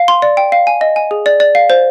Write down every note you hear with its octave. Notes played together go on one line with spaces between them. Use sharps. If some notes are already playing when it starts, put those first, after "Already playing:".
Already playing: F5
C6
D5
G5
F5
G#5
D#5
G#5
G#4
D5
D5
F5
C5